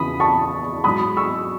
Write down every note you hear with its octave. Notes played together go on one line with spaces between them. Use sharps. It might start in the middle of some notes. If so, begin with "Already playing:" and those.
Already playing: E2 C#3 E3 B5 D#6
A5 C#6
G#2 F#3 B5 D#6
C#6 E6